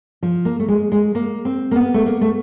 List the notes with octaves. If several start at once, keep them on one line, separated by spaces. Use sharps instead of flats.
F3
A#3
A3
G#3
G#3
A#3
C4
A#3
B3
A3
A#3
A3